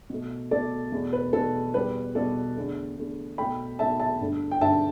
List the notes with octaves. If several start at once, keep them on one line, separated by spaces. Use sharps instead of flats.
B2 A3
B2 A3 A4 D5
E2 B2 A3
B4
E2 B2 A3 A4
E2 B2 G3 B4
E2 B2 G3 A4 D5
E2 D3 A3
E2 D3 A3
B2 A3 G5 B5
B2 A3 E5 A5
E5 A5
G2 D3 A3
G5
G2 D3 A3 E5 A5